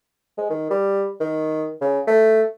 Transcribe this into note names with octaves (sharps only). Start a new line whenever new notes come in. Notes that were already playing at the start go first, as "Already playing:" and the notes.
G#3
D#3
G3
D#3
C#3
A3